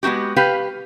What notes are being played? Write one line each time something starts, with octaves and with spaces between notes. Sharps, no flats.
G#3 B3 D#4 F#4 G4
G4 B4 F5